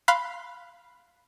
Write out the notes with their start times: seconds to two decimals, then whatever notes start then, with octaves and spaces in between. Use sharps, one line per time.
0.08 F5 B5 C6 F#6